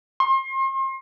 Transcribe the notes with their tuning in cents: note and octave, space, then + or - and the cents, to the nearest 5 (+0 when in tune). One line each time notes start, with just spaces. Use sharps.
C6 +35